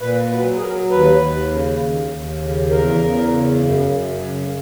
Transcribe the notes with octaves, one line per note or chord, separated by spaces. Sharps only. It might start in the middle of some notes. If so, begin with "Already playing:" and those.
A#2 B4
F#3 B4
G#4
F#3 A#4
D#2 B4
D#2
C#3
D#2
D#2
C#3
E2 A#4
E2
C#3
F#2
F#2
C#3